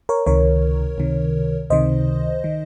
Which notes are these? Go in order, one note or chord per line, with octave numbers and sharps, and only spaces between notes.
A#4 C#5
C#2 C3 D#3 A#4 C#5
C#2 C3 D#3
C#2 C3 D#3 C5 D#5
D#3